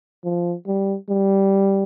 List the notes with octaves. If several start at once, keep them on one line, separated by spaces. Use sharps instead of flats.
F3
G3
G3